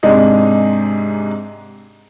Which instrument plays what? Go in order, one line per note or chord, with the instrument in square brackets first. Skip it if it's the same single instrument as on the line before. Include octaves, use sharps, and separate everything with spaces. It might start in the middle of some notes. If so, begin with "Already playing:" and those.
[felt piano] G#2 C3 G#3 D4 D#4 G#4